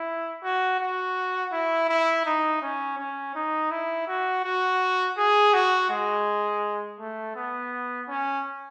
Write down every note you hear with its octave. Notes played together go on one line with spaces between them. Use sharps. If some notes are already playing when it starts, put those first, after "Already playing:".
Already playing: E4
F#4
F#4
E4
E4
D#4
C#4
C#4
D#4
E4
F#4
F#4
G#4
F#4
G#3
A3
B3
C#4